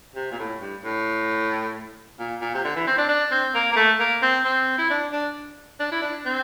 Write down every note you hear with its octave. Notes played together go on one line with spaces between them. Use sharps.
C3
A#2
A2
G2
A2
A#2
A#2
C3
D3
E3
C4
D4
D4
C4
A#3
A#3
A3
A#3
C4
C4
E4
D4
D4
D4
E4
D4
C4